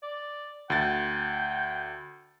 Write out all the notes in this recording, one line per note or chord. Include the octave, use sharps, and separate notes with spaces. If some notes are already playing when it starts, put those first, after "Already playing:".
D5
D2 G5 A6